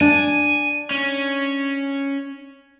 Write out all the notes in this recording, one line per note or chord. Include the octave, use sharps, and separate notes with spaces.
D4 G#5
C#4